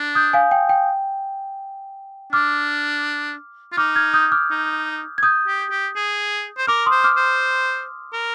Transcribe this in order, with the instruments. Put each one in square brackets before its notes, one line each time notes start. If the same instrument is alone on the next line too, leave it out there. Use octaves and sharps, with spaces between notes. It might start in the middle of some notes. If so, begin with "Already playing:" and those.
Already playing: [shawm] D4
[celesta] D#6 G6
F5 G#5
G5
G5
[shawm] D4 [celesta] D6 F6
[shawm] F4
[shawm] D#4 [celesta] D6 F6
[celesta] F6 G#6
D#6 G6
D6 F6
[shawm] D#4
[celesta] G#6
D#6 G6
[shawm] G4
G4
G#4
C5
[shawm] A#4 [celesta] D6 F6
[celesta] C6 D#6
[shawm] C5
[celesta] D6 F6
[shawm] C5
A#4